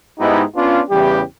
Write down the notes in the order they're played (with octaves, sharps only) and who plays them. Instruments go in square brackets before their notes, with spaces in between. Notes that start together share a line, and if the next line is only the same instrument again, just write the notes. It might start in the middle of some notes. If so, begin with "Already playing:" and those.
[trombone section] G#2 G#3 B3 D#4 E4 G4
B3 C#4 D4 F4
E2 C#3 E3 G3 G4